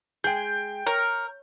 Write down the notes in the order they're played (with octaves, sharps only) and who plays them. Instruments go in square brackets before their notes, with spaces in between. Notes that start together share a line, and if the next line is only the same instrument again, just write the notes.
[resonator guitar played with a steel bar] G#3 G#4 [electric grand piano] G5 G6
[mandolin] A#4 [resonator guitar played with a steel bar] C#5